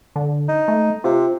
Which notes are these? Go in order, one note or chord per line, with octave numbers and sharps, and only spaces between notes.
D3
D#4
A3
C3 F4